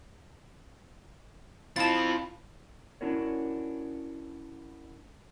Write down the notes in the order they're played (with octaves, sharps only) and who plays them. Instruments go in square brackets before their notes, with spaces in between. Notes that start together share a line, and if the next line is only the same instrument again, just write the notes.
[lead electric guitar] C4 F4 [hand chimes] E4 F5 B5 [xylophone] A5 A6
[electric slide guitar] C#4 D4 E4 F#4 A#4 C#5